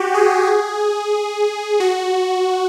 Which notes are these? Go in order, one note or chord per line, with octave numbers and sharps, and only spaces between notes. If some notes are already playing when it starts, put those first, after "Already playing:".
Already playing: F#4 G4
G#4
F#4